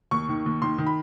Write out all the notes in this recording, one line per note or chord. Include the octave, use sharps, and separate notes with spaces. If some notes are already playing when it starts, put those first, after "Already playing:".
D#2 C#6
D#3
D#2
D#3 C6
D#3
B5